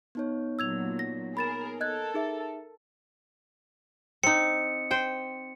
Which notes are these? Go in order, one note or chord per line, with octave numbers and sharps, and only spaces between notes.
B3 D#4 C#5
A#2 F#3 E6 G#6 F7
A#6
G#4 A#4 B5 A6 E7
A4 A#4 D#5 F#6 G#6
D#4 G#4 E5
C4 D#4 C#7
C5 G5